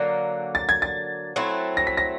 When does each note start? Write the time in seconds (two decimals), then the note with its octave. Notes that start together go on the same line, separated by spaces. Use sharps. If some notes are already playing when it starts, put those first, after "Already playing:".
Already playing: D3 F#3 A#3
0.55 A6
0.69 G#6
0.82 A6
1.36 F#3 A3 C4 E4
1.77 A#6
1.87 B6
1.97 A#6